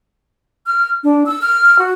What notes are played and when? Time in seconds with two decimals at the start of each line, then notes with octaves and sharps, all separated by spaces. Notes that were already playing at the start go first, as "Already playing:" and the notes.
0.66 F6
1.03 D4
1.25 E6
1.40 F6
1.78 F#4